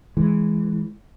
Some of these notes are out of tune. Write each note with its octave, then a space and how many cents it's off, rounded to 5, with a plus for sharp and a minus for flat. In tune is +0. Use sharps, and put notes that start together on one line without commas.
E3 +0 G#3 +0